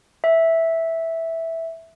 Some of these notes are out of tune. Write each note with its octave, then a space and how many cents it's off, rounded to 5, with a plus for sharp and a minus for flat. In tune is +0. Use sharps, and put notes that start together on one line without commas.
E5 -5